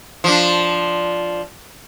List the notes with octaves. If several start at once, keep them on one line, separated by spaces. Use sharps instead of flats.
F3 D4